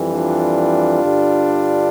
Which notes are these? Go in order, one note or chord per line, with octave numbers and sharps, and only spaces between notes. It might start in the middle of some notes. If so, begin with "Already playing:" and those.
Already playing: F2 E3 G3
D4 F4
G2 D3 G3